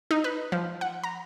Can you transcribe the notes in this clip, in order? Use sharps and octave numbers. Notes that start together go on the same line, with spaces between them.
D#4
B4
F3
F#5
A#5